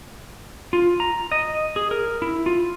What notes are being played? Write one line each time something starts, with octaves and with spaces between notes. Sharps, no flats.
F4
A#5
D#5
G#4
A#4
E4
F4